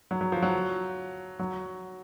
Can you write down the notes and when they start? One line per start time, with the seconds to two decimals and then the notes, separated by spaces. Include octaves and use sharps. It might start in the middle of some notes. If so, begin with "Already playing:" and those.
0.11 F#3
0.21 F#3
0.32 F3
0.42 F#3
1.39 F#3